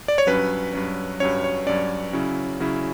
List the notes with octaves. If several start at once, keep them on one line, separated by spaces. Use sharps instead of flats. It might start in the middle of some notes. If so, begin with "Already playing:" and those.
D5
C#5
G2 F#3 C#4 B4
G2 F#3 C#4
G2 F#3 C#4 C#5
C#5
G2 F#3 C#4 D5
C#3 F#3 C#4 E4
C#3 F#3 C#4 E4